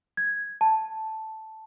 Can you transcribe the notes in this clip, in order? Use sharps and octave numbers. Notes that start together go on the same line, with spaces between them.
G#6
A5